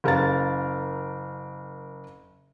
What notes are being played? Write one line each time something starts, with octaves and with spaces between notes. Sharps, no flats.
F#1 A#4 F5 A6